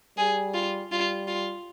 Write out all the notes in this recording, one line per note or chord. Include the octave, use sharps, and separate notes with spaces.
G3 G#4
F4
G3 F4
F4